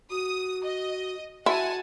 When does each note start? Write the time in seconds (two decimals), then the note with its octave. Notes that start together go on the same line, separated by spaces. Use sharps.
0.10 F#4 D#6
0.64 D#5
1.46 E4 F#4 F#5 G#5 A5